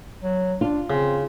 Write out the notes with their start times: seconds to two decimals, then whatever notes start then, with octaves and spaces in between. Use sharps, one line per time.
0.23 F#3
0.61 D4 F4
0.90 C#3 C4